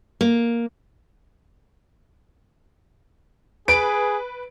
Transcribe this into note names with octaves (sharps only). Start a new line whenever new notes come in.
A#3
G#4 B4 D7